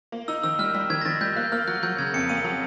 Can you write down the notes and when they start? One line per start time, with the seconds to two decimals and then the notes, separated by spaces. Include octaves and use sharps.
0.12 A#3
0.28 D#4 E6
0.43 D#3 E6
0.59 G3 F6
0.74 G3
0.90 D#3 G#6
1.01 A#6
1.05 D#3 A6
1.21 G3 G6
1.36 A#3 F#6
1.52 A#3 F6
1.68 F#3 F#6
1.83 F#3 G6
1.98 C#3 G#6
2.14 F2 C#7
2.29 A#3 D#7
2.44 F#3